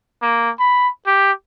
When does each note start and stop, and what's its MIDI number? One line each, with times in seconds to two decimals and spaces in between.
0.22 0.50 58
0.59 0.88 83
1.07 1.32 67